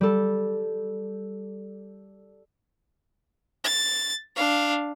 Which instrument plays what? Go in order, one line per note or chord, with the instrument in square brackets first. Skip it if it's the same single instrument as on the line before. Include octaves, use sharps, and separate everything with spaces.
[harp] G3 A4
[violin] A6
D4 F5